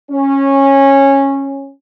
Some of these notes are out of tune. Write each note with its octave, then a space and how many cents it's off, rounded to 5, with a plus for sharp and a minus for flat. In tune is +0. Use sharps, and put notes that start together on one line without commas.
C#4 -15